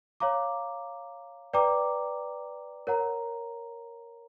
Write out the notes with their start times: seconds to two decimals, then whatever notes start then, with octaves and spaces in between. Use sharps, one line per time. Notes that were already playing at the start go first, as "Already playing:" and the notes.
0.20 C#5 F5 A#5 D6
1.53 B4 D5 G5 A#5 D6
2.87 A#4 C#5 F#5 A#5